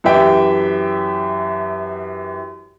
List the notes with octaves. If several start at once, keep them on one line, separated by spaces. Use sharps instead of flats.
F#2 E3 G4 E5 G5